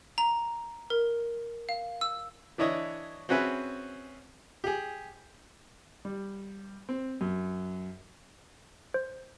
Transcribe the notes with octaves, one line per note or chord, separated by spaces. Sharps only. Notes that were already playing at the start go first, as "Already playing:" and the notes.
A#5
A#4
F5
E6
E3 D4 E4 C#5 D#5 D#6
C4 C#4 F#4 G#4 B4 E5
G4 G#4
G3
C4
F#2
C5